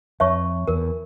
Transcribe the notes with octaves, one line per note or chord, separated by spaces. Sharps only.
F2 C#5 E5 A5 C#6
E2 A#4